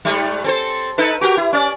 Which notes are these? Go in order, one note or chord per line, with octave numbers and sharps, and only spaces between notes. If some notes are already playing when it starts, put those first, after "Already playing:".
G#2 G3 A3
C4 A4 C5
D#4 A4 B4
F#4 G4 A#4
E4
C#4 D5